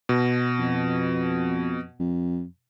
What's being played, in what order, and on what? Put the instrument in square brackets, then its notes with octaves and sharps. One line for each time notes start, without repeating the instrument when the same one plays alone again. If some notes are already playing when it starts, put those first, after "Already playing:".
[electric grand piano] B2
[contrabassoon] F2
F2